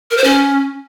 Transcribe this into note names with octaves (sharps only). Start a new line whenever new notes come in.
A#4
C5
C#4